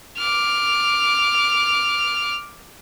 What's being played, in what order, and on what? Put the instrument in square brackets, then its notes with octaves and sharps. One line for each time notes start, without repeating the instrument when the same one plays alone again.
[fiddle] D6 F6